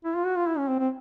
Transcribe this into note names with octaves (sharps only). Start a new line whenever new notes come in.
E4
F4
F#4
F4
E4
C#4
C4
C4